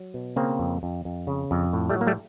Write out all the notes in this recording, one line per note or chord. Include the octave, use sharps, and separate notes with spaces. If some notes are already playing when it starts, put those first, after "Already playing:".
Already playing: F#3
B2
C#3 A#3 C4
F2
F2
F2
C#3
F2
A2
G3 A3
F#3
A#3
G3 A3